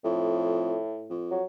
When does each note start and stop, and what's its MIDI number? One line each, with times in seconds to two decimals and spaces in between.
0.04 0.77 41
0.04 1.18 45
1.10 1.39 41
1.31 1.44 54